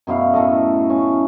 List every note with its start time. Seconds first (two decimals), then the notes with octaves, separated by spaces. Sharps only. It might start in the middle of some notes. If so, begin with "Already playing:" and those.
0.07 F#2 B2 E4 F5
0.34 A2 A3 A4 D#5
0.90 C#4